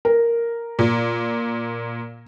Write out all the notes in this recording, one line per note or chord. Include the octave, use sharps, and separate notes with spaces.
A#4
A#2